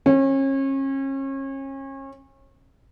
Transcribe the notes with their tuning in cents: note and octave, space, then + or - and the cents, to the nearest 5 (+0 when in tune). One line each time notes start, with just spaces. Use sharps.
C#4 -35